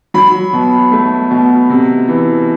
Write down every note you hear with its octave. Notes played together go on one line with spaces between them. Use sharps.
F#3 B5
B2
A3
B2
C3
E3